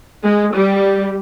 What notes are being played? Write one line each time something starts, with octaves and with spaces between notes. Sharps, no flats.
G#3
G3